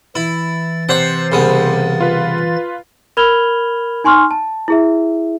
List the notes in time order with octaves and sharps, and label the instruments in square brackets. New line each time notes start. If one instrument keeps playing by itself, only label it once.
[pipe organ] E3 A6 [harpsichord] E4
[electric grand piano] C3 C5 C7 [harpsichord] C#5 F#5
[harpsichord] C2 C#3 B3
[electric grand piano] F4 B4
[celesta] A#4 B5 F6 G#6 F7 G7
D#4 G#5 C6 C#6 F6
A5
E4 G#4 E5